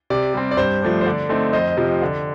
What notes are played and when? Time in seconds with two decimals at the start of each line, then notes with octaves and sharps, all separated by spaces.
0.10 C3 D5
0.34 G3 C4
0.51 D5
0.57 G2 C5
0.82 F3 A3 D4
1.01 C5
1.05 D3 D5
1.29 A3 C4 D#4
1.53 F2 C5 D#5
1.77 C3 F3
2.02 D3